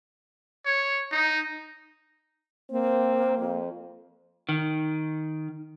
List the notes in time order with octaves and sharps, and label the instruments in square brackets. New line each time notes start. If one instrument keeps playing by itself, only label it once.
[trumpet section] C#5
D#4
[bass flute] A#3 [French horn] C4
[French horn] F2
[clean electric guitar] D#3